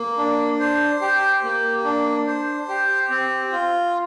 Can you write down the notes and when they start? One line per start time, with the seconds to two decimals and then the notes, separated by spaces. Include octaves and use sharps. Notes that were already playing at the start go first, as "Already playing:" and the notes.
Already playing: A#3
0.18 D4
0.60 C5
1.01 G4
1.43 A#3
1.84 D4
2.26 C5
2.69 G4
3.10 C4
3.52 F4